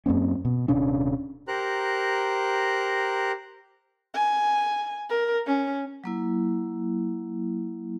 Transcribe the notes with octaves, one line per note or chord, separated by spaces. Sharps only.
F#2 A#3 C4 C#4
B2
D#1 C3 C#4 D4
G4 A#4 C5 A#5 F#6
G#5
A#4
C#4
F#3 A#3 E4